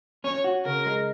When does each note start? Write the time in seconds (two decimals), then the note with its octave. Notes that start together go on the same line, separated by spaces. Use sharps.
0.24 C#4 C#5
0.44 F#4
0.65 C#3 A#4
0.86 G#3